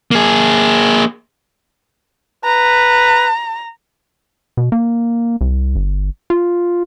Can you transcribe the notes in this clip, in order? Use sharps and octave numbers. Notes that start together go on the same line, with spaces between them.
A#3 G#4
B4 A#5
B2
A#3
C2
G1
F4